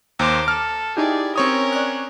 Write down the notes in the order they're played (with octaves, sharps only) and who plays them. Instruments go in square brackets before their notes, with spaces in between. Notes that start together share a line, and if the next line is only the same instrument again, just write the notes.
[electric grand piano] D#2 [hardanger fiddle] C5 D6 [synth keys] A#5
[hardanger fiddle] A4 [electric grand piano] F6
[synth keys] D#4 E4 G4 [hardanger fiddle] G#4 D5
[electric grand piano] C4 C#5 D#6 [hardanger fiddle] C#4 A#4
[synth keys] D5 F#6